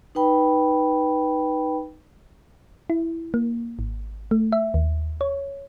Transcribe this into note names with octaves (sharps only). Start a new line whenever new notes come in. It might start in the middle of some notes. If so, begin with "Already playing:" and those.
D#4 B4 G5 B5
E4
A#3
G#1
A3
E5
D#2
C#5